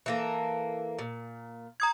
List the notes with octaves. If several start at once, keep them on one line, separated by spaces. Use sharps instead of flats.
E3 A#3 A4
A#2
A#5 D#6 G#6